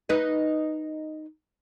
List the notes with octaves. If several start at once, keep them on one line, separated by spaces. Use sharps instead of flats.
D#4 B4 D#5